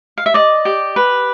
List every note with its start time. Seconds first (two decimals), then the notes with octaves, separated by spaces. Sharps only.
0.18 F5
0.26 E5
0.34 D5 D#5
0.65 G4
0.96 B4